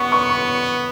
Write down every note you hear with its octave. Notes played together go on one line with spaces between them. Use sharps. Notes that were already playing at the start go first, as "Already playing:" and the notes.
Already playing: B3 C#6
C#6
C#6